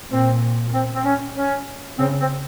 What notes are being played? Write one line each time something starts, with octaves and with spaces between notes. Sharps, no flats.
A#2 C4
C4
C4
C#4
C#4
C#3 C4
C4